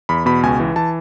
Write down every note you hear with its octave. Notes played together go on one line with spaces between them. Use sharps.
E2 B5
B2 B5
C#2 G#5
E3
E3 A5